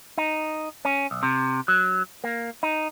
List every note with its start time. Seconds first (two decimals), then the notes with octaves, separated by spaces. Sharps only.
0.18 D#4
0.85 C#4
1.11 B1
1.23 C3
1.68 F#3
2.24 A#3
2.63 D#4